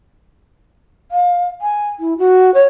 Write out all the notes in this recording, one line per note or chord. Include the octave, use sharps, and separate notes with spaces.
F5
G#5
E4
F#4
C#5